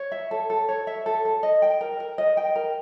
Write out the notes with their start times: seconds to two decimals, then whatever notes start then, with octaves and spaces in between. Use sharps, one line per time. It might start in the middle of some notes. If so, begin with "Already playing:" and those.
Already playing: C#5
0.12 E5
0.31 A4
0.50 A4
0.69 C#5
0.87 E5
1.06 A4
1.25 A4
1.43 D#5
1.62 G5
1.81 A#4
2.00 A#4
2.18 D#5
2.37 G5
2.56 A#4